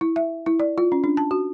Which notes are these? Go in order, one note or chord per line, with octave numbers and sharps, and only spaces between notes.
E4
E5
E4
D5
F4
C#4
D4
A5
F#4